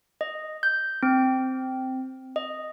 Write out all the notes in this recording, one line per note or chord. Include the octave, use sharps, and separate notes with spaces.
D#5
G6
C4
D#5